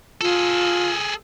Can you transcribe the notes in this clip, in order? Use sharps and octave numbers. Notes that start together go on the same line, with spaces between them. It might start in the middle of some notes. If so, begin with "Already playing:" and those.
F4 G#4 A4